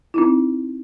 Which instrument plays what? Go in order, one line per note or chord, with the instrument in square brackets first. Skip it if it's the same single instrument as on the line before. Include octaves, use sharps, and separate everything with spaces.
[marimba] C4 D#4 E4